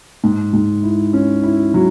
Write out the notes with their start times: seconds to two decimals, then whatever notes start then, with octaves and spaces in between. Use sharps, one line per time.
0.24 G#2
0.53 G#2
0.83 E4
1.13 C#4
1.43 E4
1.74 F#3